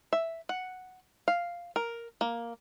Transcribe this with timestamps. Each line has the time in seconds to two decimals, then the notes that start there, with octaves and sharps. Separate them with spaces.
0.13 E5
0.49 F#5
1.28 F5
1.76 A#4
2.21 A#3